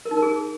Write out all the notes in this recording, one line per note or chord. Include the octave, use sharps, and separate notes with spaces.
A#4
D#4
A#4
G#4